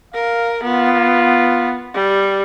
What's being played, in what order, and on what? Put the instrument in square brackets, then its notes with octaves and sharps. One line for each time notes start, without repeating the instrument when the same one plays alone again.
[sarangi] A#4 [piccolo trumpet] F5
[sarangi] B3 [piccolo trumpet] F4
[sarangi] G3